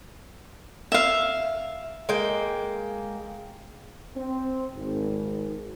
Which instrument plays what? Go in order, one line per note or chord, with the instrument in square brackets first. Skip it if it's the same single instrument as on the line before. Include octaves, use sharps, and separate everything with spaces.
[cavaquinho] E5 F5
[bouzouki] G#3 A#3 G5
[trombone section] C4
G#1